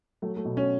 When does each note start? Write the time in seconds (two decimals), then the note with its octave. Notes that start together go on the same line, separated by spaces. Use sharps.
0.22 F#3 A3
0.37 A3
0.45 B2
0.57 C#4